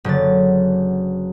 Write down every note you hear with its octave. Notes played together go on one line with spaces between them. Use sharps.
F#1 D3 F#3 A6